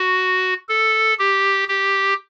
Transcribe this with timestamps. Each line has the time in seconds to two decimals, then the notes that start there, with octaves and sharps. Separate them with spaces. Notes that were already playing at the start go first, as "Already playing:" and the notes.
Already playing: F#4
0.69 A4
1.19 G4
1.69 G4